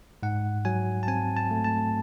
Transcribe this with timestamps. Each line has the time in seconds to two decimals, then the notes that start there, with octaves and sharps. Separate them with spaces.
0.23 G#2 F#5
0.65 F#3 G#5
1.03 A5
1.08 C4 G#5
1.37 A5
1.51 A3
1.64 A5